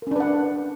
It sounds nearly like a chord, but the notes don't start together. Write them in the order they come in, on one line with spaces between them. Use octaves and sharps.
A#4 C#4 D4 B4 F#5